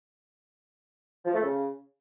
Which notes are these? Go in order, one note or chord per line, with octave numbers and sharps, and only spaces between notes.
F3
A3
C#3